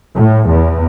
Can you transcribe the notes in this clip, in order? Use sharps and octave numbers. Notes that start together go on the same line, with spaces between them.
A2
E2